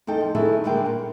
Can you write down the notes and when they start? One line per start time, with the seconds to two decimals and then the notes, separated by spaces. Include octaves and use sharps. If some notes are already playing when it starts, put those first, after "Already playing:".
0.07 E2 D#4 A4 G5
0.20 F3
0.35 D#3 F#3 B3 E4 G#4 A4
0.64 D3 G3 G#3 A#3 B4 G5
0.86 A#2